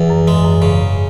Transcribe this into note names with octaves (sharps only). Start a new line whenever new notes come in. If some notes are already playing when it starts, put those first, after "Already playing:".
Already playing: E2
F#2
G#2 G#3
F#2
G#2 C#3